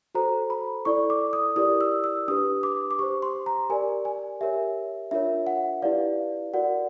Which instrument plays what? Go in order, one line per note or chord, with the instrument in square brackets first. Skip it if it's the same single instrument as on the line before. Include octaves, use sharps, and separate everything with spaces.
[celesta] F#4 A4 C5 A#5
B5
E4 A4 D5 C#6
D6
D#6
E4 G4 A#4 D5 D#6
E6
E6
D4 G4 B4 D#6
D6
D6
G4 C#6
C5
C6
A#5
G4 A#4 D5 G#5
G#5
G4 A#4 C#5 E5
D4 F4 A#4 C#5 E5
F#5
E4 G4 B4 D5 F5
F#4 A#4 D5 F#5